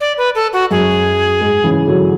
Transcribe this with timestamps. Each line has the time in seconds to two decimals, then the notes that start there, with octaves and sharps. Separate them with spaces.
0.01 D5
0.18 B4
0.35 A4
0.53 F#4
0.71 F#2 G#4
1.41 G#2
1.64 C#3 E3
1.88 D3 F#3